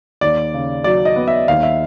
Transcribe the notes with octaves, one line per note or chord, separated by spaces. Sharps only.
D#2 D5
C#3
F#3 D5
D#5
B3
E5
D#2 F5
E5